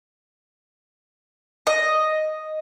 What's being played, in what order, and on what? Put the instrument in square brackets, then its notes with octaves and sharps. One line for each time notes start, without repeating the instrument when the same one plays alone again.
[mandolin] D#5